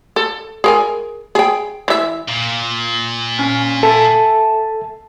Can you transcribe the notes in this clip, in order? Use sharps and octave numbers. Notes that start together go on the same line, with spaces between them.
A4
G#4 A#4 G#5
G#4 G5
E3 E5
A#2
C#4
A4 E5 G#5 A5